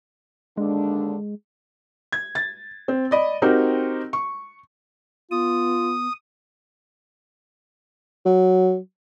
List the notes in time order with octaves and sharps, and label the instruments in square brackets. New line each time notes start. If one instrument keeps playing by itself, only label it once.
[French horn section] D#2 D3 D4 [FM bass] G#3
[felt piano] G#6
A6
C4
D5 D#5 B5
C4 D#4 F#4 G4 A#4
C#6
[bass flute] B3 [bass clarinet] F4 [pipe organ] D#6
[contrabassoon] F#3